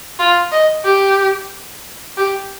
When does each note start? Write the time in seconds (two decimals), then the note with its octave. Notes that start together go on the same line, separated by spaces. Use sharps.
0.19 F4
0.52 D#5
0.84 G4
2.17 G4